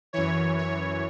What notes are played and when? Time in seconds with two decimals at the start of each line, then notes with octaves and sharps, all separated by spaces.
0.13 F#2 E3 C#5
0.58 C#5